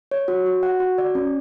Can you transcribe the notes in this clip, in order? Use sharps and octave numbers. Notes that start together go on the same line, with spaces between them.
C#5
F#4
F#4
F#5
F#4
D5
C#4